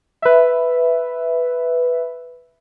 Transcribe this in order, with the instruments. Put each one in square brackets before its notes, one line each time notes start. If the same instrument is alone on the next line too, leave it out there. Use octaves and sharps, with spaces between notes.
[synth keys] B4 E5